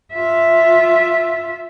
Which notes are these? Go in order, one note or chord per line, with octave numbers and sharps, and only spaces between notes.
F4 E5